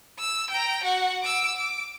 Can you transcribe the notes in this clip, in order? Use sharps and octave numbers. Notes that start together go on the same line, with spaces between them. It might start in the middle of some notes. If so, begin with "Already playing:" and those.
E6
G5 A#5
F#4 F#5
D6 E6
D6